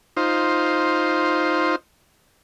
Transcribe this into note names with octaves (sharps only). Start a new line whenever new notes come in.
D#4 F4 C5